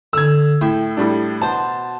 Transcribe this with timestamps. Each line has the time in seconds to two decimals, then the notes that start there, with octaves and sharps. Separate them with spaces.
0.13 D3 E6 G#6
0.61 A2 E5 G5
0.97 A2 G3 D4
1.42 B2 C5 A5 C6